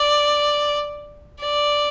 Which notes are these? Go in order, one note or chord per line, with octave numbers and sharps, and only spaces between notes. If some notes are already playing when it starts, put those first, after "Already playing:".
Already playing: D5
D5